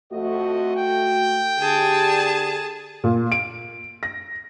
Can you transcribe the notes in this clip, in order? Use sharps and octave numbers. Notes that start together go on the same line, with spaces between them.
F2 A3 F#4 D#5
G5
D3 G4 G#4 A5
A#2
D7
A#6